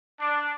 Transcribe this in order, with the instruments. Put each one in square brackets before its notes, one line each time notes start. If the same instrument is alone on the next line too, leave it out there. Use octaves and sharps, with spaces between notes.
[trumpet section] D4